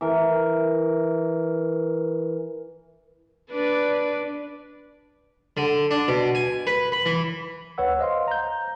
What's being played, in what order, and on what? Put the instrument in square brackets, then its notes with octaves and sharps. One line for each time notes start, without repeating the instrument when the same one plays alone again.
[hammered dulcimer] E3 A#4
[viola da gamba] D4 B4 D5
[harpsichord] D3
D4
B2
G#5
B4
B5
E3
[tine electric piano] D2 B4 C#5 F#5 E6
C5 D#5 F5 C6
A#5 G6